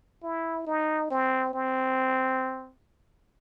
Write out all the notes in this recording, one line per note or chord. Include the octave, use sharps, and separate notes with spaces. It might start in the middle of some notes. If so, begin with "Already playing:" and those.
E4
D#4
C4
C4